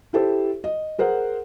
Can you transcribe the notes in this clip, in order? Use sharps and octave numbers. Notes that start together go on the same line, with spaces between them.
E4 G4 A4 C5
D#5
G#4 A#4 C5 F#5